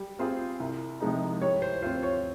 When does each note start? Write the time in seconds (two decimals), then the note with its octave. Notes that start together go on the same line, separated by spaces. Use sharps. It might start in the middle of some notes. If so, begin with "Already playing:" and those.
Already playing: G3
0.19 C4 F4 G#4 C5
0.60 C2
1.01 C3 F3 G#3 D#4
1.41 G3 C#5
1.62 C5
1.83 F4 C5
1.86 C4
2.03 C#5